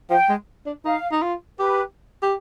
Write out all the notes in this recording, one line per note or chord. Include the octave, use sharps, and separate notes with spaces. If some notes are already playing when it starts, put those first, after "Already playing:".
F3 G5
G#3
D4
D#4 F5
D#4
F4
G4 B4
G4